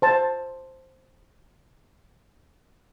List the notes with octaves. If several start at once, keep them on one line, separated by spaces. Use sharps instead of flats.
C5 A5